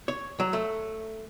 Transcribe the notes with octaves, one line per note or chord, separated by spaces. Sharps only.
C#5
F#3
A3